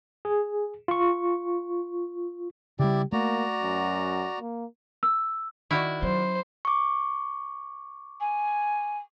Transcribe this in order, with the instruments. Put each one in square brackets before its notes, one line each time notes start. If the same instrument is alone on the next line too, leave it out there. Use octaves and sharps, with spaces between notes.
[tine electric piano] G#4
F4 C#6
[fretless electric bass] C#3 G3 [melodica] E4 D5 [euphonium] G4
[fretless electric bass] A3 [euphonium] A#3 [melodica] F#4 D5 A#5
[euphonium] F#2
A#3
[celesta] E6
[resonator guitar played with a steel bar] D#3 F#4 D5 [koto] E4
[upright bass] F#3 C#4 [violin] C5
[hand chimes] C#6 D6
[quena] G#5